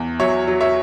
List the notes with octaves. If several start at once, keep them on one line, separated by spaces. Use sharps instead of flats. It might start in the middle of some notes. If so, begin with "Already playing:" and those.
Already playing: E2
F#3 C#5 E5
F#3
C#5 E5